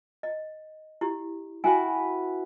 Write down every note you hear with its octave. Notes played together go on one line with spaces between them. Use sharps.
D#5
E4 G4
E4 F#4 B4 G5 G#5